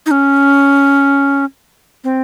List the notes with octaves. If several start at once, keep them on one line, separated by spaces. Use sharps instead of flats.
D#4
C#4
C4